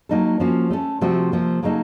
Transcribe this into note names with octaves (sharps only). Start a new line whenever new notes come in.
F#3 A#3 D#4 A4
F3 A#3 C#4 F#4
A3 C#4 A4
C3 F3 A3 C4 F#4
C3 F3 A#3
C#3 F#3 A#3 D#4 A4